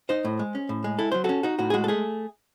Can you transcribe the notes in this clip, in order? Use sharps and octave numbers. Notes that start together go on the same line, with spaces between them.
D#4 C5 D#5
A2
G#3
C#4
A2
G#3
E4 A4
F#3 C5
C#4 F#4 A4
D#4 F#4
A2 F#4
G#4
G#3 F#4
A4
A3 G#4